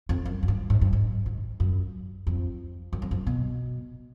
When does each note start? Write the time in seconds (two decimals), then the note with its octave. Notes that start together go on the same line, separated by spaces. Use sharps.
0.09 F2
0.26 F#2
0.43 F#2
0.48 G2
0.70 G#2
0.81 G2
0.93 G#2
1.26 G#2
1.60 F#2
2.27 F2
2.93 F#2
3.02 F2
3.11 F#2
3.27 B2